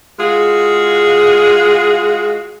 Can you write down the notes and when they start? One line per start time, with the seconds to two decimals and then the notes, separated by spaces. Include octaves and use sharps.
0.19 G#3 F4 F#4 G#4